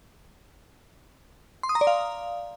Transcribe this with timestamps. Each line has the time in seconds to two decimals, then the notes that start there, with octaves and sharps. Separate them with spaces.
1.63 C6
1.69 D#6
1.75 A#5
1.81 D5
1.87 F5